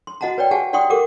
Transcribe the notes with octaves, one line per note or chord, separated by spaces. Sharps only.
C6
F#4 D#5 F#5 A5 A#5
B4 C#5 D5 G5
G4 G#4 F#5 G#5 A5
D5 F#5 G5 C6 C#6 D#6
G4 A4 A#4 F#5 D6